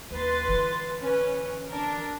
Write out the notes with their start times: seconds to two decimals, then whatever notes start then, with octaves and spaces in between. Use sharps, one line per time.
0.11 D#2 B4 C6 A6
0.48 D3 E3
1.03 C#4 B4
1.68 D4 A#4